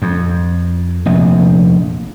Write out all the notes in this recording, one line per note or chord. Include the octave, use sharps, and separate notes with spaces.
F2
F1 A#1 E2